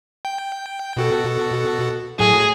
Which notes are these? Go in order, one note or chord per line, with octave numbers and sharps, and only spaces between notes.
G5
B2 F#4 A4
A2 F#3 G#4